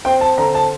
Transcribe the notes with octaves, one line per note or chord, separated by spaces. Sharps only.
C4 G5
A5
D3 A#5
A5